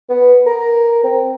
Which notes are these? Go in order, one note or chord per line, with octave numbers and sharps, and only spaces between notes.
B3
A#4
C4